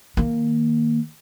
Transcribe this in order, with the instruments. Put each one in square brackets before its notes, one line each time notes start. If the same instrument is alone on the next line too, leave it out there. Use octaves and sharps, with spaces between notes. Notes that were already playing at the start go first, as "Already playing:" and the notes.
[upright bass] D#3 A#3